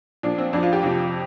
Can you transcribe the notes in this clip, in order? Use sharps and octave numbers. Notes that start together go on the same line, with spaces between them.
A#2 F3 D4
C4
F2 F3 D4
F4
G4
F2 C3 F3